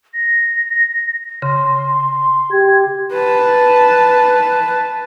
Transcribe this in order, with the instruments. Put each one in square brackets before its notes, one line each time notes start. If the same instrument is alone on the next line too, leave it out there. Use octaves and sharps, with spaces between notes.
[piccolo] A#6
[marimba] C#3 [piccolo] C6
[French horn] G4 [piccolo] G#6
[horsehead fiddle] B4 A5